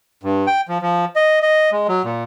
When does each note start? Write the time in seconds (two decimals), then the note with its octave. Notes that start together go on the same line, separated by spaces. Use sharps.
0.23 G2
0.47 G5
0.68 F3
0.82 F3
1.16 D#5
1.42 D#5
1.72 G#3
1.88 F#3
2.04 A#2